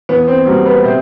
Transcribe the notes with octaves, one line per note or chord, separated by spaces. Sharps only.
E2 B3
C4
B2 F#3 G3 A#3 F#4
B3 B4
B4
C3 C4 C5